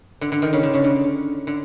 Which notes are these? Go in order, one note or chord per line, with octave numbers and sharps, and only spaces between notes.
D3
D3
D#3
C#3
D3
C#3
D3
D3